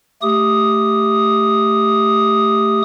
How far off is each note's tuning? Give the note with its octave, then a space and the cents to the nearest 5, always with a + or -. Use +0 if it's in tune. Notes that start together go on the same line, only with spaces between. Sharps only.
A3 +5 G4 +0 D#6 +0